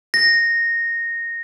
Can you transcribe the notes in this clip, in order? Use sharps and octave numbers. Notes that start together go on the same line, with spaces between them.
A#6